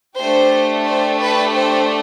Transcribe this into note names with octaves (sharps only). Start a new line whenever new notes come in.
A3 D4 G4 C5
C5
B4
C5